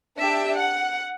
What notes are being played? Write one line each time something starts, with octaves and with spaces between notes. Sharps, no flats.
D4 G4 E5
F#5